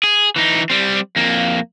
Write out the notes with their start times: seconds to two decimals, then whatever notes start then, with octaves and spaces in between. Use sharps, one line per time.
0.04 G#4
0.36 E3 D#4
0.70 G3 C4
1.16 F2 A#3